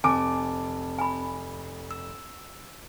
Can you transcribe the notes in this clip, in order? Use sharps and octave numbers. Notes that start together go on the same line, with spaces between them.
F1 C4 G#5 A5 D6 D7
G#5 B5
E6